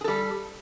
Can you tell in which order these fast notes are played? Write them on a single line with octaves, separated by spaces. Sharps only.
G#4 A4 G3